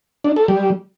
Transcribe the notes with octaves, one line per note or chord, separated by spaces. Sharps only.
D4
A4
G3